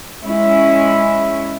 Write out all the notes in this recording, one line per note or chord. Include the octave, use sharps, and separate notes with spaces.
G#3 C#4 E4